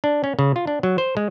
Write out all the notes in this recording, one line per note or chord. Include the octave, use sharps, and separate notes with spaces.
D4
C#4
C#3
F4
D4
F#3
C5
G#3